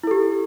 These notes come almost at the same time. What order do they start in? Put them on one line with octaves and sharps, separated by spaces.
E4 A4 G4